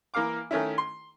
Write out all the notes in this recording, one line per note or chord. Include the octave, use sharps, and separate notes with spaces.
E3 A#3 A#4 F5 D6
D#3 A3 C#4 E4
C6